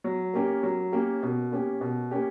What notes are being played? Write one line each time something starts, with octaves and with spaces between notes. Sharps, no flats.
F#3
A#3 C#4 G4 A#4
F#3
A#3 C#4 G4 A#4
B2
A#3 C#4 G4
B2
A#3 C#4 G4